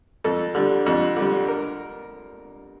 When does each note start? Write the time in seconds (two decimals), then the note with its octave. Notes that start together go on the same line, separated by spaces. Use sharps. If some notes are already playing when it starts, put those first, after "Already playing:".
0.24 F2 A4
0.55 D3 G3
0.86 F2
1.17 D3 G3
1.48 A#4